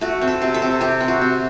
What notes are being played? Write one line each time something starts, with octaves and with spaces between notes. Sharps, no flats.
A3 F#4
C4
A4
C3
A4
C3
C3 G4
C4
F#4
C3